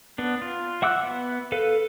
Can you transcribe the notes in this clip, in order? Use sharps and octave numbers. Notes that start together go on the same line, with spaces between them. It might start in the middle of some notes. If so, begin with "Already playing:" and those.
B3 D4
F4
E5 F#5 D6 E6 F#6
B3
A4 B4 F5